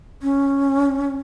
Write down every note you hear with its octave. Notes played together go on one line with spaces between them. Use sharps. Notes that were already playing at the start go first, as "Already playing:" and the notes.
C#4